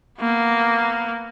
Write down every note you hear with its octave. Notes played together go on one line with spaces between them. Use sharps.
A#3 B3